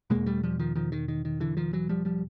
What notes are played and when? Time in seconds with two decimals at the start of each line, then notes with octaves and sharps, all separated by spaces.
0.10 E2 B2 G#3 A#3
0.26 G3 A3
0.43 F3 G3
0.59 D#3 F3
0.75 D#3 F3
0.92 D#3
1.08 D#3
1.25 D#3
1.40 D3 E3
1.57 D#3 F3
1.73 E3 F#3
1.89 F3 G3
2.05 F3 G3